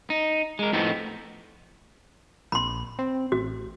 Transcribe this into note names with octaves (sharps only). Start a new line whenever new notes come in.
D#4
G#3 A#4
F2 A2 B3 C4 D#4
A#1 B5 C6
C4
A1 F#4